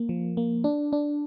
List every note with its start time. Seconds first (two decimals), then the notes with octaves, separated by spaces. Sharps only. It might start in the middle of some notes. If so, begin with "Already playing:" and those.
Already playing: A#3
0.09 F3
0.37 A#3
0.64 D4
0.93 D4